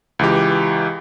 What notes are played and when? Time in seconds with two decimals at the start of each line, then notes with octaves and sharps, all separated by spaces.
0.19 C#2 E3 G4